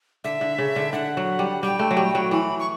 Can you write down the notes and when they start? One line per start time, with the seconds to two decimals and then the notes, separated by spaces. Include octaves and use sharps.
0.24 D3 E5
0.41 D3
0.58 C#3
0.76 D3
0.93 D3 F#5
1.17 F#3
1.39 G3
1.63 G3 G5
1.79 A3
1.91 F#3
1.97 G3
2.15 F#3
2.31 E3 B5
2.59 C#6